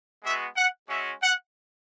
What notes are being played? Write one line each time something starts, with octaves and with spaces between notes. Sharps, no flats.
G#3 B3 F#4 E5
F#5
G#3 C#4 F#4 E5
F#5